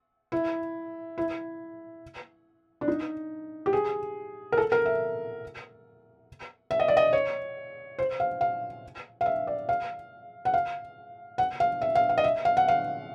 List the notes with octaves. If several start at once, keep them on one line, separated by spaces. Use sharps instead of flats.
E4
E4
D4
D#4
G4
G#4
A#4
A4
A#4
E5
E5
D#5
D5
D#5
C#5
C5
F5
F5
F5
E5
D5
F5
F#5
F5
F#5
F5
E5
F5
F5
D#5
E5
F5
F#5
F5